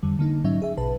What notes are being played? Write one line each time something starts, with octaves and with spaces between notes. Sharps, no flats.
F2 D3 G3
D3 A#3 D#4
G#2 F#3 C#4 D#4 E5
G#4 E5
A#1 B2 B4 A5